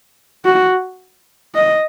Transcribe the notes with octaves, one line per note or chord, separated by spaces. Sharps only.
F#4
D#5